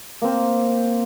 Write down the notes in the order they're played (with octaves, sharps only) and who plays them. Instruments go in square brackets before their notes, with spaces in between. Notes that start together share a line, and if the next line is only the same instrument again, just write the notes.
[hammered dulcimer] A#3 C4